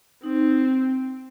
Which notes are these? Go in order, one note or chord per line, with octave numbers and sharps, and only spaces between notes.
C4 D#4